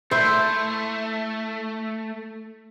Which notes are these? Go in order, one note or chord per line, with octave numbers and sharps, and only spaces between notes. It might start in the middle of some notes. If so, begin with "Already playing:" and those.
A3 E4 C5